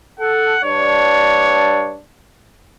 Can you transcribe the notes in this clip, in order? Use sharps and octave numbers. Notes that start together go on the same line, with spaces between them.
A4 F#5
G2 D4 C#5